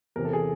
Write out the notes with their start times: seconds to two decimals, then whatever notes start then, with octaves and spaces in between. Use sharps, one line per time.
0.16 E2 C3 E3 A#4
0.25 A4
0.33 G#4